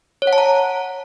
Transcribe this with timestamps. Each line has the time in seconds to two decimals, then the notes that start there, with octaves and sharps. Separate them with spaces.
0.22 C#5
0.27 F#5
0.33 A5
0.38 A#5